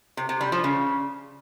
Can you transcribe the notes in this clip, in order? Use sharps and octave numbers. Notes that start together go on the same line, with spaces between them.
C3
C3
G3
F3
C#3